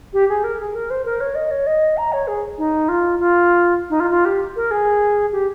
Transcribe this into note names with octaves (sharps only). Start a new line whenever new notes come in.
G4
G#4
A#4
G#4
A#4
C5
A#4
C#5
D#5
C#5
D#5
A#5
C#5
G#4
D#4
F4
F4
D#4
F4
F4
G4
A#4
G#4
G4